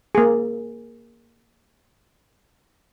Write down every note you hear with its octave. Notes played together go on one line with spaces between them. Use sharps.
A#3 G#4